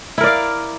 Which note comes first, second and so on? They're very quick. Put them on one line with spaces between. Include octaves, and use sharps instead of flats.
E4 A#4 D5 F5